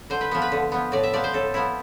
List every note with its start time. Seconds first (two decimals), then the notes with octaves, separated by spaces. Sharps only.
0.10 D3 C5
0.21 B4
0.31 F3 B3
0.42 B4
0.52 D3
0.72 F3 B3
0.92 A2 D5
1.03 E5
1.13 F3 B3 D5
1.24 C5
1.33 A2 A4
1.54 F3 B3 E4